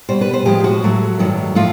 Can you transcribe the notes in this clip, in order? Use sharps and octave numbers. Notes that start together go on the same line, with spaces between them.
B2 G3 C5
B4
C5
A2 F3 G#3 G4
F#4
A2 F#3 A3
G2 D#3 F#3 A3
A2 F3 A3 F4